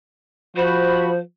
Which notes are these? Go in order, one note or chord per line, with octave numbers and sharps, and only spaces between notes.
F3 F#4 C5 B5